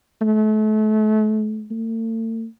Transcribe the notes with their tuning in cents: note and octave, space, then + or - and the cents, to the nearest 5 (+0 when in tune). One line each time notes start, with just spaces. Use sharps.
A3 -35
A3 +45